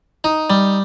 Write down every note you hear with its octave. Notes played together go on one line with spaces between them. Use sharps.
D#4
G3